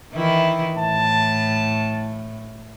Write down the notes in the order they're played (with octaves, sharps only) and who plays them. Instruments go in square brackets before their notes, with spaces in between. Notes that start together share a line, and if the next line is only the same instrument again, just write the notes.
[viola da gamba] D#3 E3 E4
[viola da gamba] A2 [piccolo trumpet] A5